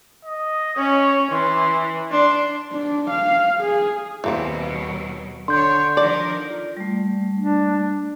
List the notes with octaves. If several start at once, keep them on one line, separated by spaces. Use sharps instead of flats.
D#5
C#4 C#5
E3 C6
D4 C6
D4
F5
G#4
D#2 B2 E3 F#3 A#3 C4
D3 D4 C#5 C6 G6
D#3 F3 A#4 D5
F4 D5
G3 A3
D4